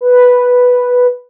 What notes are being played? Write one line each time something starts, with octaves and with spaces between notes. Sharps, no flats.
B4